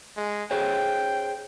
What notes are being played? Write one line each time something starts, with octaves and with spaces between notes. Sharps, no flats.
G#3
G#4 C5 C#5 G5